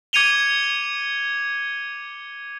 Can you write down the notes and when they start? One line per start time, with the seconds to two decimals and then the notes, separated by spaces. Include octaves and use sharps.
0.13 D6 G#6 C#7 D#7 F7 G7